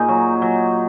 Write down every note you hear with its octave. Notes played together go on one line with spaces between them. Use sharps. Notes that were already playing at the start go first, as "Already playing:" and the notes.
Already playing: A#2 D#4 G#4
F#3
F#3